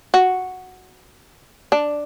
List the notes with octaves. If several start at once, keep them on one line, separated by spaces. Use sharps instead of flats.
F#4
D4